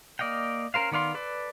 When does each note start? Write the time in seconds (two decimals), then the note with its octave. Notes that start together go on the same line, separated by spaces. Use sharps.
0.19 A#3 D5 D#5 F5 G5
0.74 C#4 A#4 C5 F5
0.92 D#3 B3 D5 F5 C6
1.14 A4 B4 D5